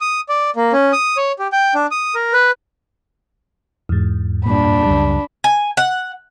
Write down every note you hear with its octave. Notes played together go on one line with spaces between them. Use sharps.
D#6
D5
A#3
C#4
D#6
C#5
G4
G5
D4
D#6
A#4
B4
E2 G#2
G2 A#2 D4 B5
C#2 F#2 G3
G#5
F#5